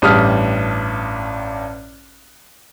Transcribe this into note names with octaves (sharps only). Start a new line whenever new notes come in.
A1 G2 G4 A5 D#6 F6